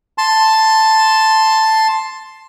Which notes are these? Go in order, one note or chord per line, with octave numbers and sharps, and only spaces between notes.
A5 C6